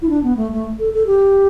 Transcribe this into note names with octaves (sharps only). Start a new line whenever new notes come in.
E4
D4
B3
A3
A3
A4
A4
G4